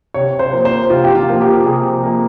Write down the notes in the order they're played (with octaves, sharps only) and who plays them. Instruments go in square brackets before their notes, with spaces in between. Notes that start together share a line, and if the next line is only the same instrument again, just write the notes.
[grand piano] C3 [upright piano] C#5
[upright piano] C5
[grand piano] F3 A#3
[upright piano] C5
[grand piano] C3 [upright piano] F4
[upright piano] G4
F4
[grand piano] F3 A#3
[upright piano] G4
[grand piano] C3 [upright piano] G#4
[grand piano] F3 A#3